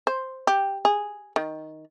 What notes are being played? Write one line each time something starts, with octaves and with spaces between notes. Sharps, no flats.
C5
G4
G#4
D#3